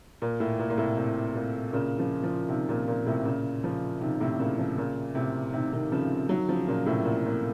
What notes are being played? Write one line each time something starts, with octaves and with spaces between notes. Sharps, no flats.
A#2
A2
A#2
A#2
A2 C3
A2 C3
A#2
A#2 C#3
C#3 F3
C#3 F3
C3 D#3
A#2 C#3
A#2
A2 C3
A#2 C#3
C#3 F3
C3 D#3
A2 C3
A#2 C#3
C#3 F3
A#2 C#3
A2 C3
C3 D#3
C3 D#3
C#3 F3
D#3 F#3
C#3 F3
A#2 C#3
A2 C3
A#2
A#2